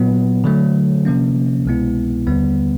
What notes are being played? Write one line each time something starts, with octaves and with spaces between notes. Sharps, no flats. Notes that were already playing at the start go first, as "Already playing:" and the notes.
Already playing: A#2 F#3 B3
D3 F#3 A3
C3 F3 A#3 C#4
C2 B2 G#3 B3 E4
D#2 D3 G3 B3